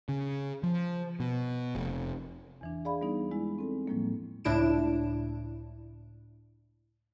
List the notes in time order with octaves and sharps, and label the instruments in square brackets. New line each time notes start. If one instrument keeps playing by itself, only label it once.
[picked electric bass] C#3
F3
B2
F1
[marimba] E2 E3 D4
G#4 D5 F5 B5
G3 B3 D#4
G#3 E4
C4 A4
A2 F3 G3 G#3 A#3
[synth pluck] C#2 A2 D4 E4 D7 E7